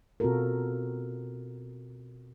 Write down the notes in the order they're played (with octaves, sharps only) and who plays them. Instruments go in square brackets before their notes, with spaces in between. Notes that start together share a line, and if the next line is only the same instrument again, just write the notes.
[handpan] B2 C4 F4 F#4 A4 A#4